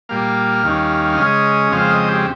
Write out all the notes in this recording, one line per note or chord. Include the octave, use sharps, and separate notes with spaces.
A#2 G3 A#3 F5
D#2 D#3 G3 C#4
C#3 G#3 C#4 D#5
F2 C#3 G#3 C4 F5
D#5
G4